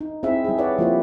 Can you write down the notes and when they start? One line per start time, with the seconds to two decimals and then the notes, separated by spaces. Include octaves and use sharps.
0.01 D#4
0.23 C4 E4 G#4 E5
0.44 G3 E4 G#4
0.58 G4 B4 C#5 D5 F#5
0.78 F3 A#3 C4 E4 G4 C5